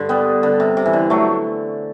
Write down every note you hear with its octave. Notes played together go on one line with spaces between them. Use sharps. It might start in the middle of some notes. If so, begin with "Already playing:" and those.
Already playing: G2 D3
G3 B3
D3
C3
C3
E3
D3
F#3 A3